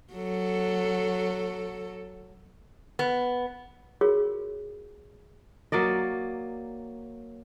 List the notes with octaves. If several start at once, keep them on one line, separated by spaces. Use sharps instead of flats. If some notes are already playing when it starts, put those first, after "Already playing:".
F#3 A4
B3
F4 F#4 G#4 A#4 C#5
F#3 A#3 D5 D#5